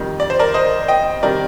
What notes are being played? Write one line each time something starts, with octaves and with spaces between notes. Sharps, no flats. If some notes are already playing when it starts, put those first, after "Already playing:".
Already playing: F2 D#3 G3
D5
C5
A#4 D5
C5 D#5
D#5 G5
C3 D#3 G3 A#4 D5